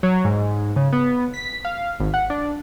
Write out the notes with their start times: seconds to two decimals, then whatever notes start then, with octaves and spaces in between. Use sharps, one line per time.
0.03 F#3
0.25 G#2
0.76 C#3
0.93 B3
1.34 B6
1.65 F5
2.00 G#1
2.14 F#5
2.30 D4